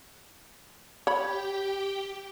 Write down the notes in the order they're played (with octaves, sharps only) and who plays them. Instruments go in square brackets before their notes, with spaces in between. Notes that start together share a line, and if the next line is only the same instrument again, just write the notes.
[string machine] G4 G5 [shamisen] C#5 B5